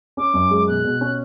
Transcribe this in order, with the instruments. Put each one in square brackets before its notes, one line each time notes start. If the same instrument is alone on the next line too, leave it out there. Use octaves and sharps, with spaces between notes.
[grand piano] C#4 [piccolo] D6
[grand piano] F#2
G#3
[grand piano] B2 [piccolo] F#6
[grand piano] B2
C#4